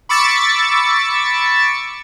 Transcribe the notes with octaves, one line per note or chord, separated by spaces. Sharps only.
B5 C#6 D6 E6 A6 C#7